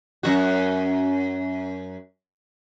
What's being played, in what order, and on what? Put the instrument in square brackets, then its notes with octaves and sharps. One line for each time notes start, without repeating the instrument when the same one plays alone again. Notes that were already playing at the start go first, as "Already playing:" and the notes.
[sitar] F#2 A#2 F#4